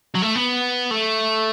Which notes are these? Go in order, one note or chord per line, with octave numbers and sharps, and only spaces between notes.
F#3
A3
B3
A3